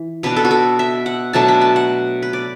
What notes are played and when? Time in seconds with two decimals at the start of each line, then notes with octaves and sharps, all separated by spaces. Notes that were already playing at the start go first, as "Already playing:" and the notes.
Already playing: E3
0.23 B2 B3 D4 B4
0.36 A4
0.45 F#4
0.51 A4
0.79 E5
1.06 F#5
1.33 B2 F#3 A3 D4 A5
1.48 B5
1.61 A5
1.76 F#5
2.22 B4
2.33 D5